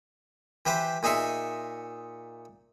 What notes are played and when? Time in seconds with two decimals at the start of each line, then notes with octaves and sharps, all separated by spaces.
0.66 E3 G4 B4 C5
1.03 A#2 D#4 G#4 E5 C6 C#6